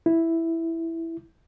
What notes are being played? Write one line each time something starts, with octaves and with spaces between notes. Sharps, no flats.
E4